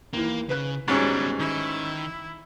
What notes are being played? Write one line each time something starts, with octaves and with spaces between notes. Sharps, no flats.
D#2 E3 A#3
C#3 B4 F#6
G#2 F#3 G3 B3 C#4 D4 C#6
D#3 E4